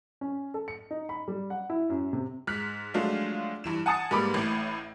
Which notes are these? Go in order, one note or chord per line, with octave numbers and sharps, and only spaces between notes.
C#4
A4
C#7
D#4
B5
G3
F#5
E4
F#2
C3
G#2 F6 F#6 B6
F3 F#3 G#3 A3 D4 F4
G2 E3 E7
F#5 G#5 A5 D#6 A6 C#7
G#2 G3 A#3 B4 B5 D6
A1 A2